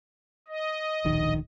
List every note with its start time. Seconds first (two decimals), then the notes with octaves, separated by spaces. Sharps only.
0.48 D#5
1.05 D1 A#1 D#3